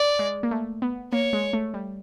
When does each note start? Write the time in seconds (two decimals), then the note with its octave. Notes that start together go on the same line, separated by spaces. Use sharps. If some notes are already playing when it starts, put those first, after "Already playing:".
Already playing: D5
0.19 G#3
0.43 A#3
0.51 A3
0.82 B3
1.12 A#3 C#5
1.33 G#3
1.53 A3
1.74 G3